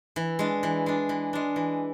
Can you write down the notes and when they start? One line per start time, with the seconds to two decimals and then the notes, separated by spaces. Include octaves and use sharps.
0.16 E3
0.39 G#3 D4
0.63 E3
0.86 G#3 D4
1.09 E3
1.33 G#3 D4
1.56 E3